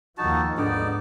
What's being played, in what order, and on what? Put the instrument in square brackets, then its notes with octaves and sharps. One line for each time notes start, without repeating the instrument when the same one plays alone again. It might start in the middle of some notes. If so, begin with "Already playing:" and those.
[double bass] D#2 F3 [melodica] D#4 F#4 A5
[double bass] G#2 [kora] D3 B3 [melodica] D#4 D5